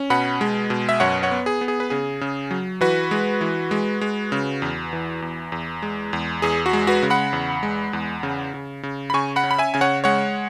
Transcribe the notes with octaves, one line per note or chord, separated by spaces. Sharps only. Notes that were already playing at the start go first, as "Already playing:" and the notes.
Already playing: C#4
B2 F#5 B5
G#3
B2
E5
F#2 C#5 F#5
C#5 F#5
B3
G#4
B3
G#4
B4
C#3 G#4
C#3
F#3
E3 F#4 B4
G#3
E3
G#3
G#3
C#3
E2
E3
E2
E2
G#3
E2
E2 G#4
F#4
G#3
F#4 B4
C#3
F#5 B5
E2
G#3
E2
C#3
C#3
C#3
B5
C#3 G#5 C#6
F#5 B5
C#4
B5
E5 G#5
C#3 G#5
C#5 F#5
G#3 C#5 F#5